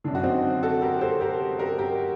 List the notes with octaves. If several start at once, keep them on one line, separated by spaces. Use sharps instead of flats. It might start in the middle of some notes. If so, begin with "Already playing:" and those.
F#2 D3 D4
F#4
C4 D#4
F#4 A4
G4 A#4
A4 C5
G4 A#4
G4 A#4
G4 A#4